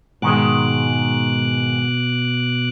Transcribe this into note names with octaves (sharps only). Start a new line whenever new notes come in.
G#2 B2 D#3 G#3 D6 F#6